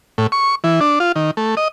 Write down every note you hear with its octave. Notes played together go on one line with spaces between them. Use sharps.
A2
C#6
E3
D4
F4
D#3
A3
D#5